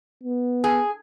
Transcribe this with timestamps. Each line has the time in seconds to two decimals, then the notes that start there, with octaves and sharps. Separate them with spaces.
0.23 B3
0.64 G#4